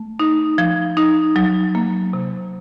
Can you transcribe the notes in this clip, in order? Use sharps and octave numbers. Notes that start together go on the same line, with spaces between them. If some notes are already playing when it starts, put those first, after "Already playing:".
Already playing: A3
D#4
F3
D#4
F#3
A#3
C3